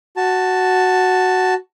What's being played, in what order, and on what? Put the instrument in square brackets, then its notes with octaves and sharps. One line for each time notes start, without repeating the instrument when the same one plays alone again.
[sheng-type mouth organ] F#4 A5